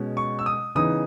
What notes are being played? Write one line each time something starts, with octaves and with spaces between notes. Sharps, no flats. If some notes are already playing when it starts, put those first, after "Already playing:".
Already playing: B2 G#3 C#4
C#6
E6
D#6
C#3 E3 B3 D#4 D#6